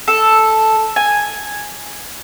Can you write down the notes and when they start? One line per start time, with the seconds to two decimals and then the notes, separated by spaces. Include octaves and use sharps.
0.08 A4
0.96 G#5